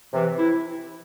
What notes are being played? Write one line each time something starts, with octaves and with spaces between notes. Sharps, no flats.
C3 E3
E4